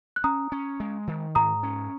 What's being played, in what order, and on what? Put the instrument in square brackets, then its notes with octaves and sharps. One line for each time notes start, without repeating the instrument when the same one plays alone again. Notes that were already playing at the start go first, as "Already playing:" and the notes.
[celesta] F#6
[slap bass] C#4 [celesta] A#5 D#6
[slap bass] C#4
G#3
D#3
[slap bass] G#2 [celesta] A#5 D#6
[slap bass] C#4